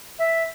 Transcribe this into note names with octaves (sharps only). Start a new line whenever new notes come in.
E5